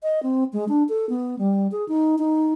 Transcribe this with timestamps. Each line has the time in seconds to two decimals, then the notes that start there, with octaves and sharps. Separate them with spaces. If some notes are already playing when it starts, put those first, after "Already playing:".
0.03 D#5
0.23 C4
0.53 G#3
0.68 D4
0.89 A4
1.09 B3
1.38 G3
1.71 G#4
1.88 D#4
2.18 D#4